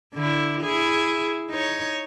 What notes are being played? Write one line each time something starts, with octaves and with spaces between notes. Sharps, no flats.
D3 E4
E4 G#4
D#4 C#5